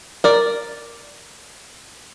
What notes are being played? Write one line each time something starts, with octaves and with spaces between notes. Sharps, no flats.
A#4 D5